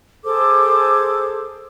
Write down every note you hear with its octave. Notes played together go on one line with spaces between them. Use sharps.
G#4 A4 C5 D6